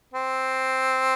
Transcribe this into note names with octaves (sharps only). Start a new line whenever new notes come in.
C4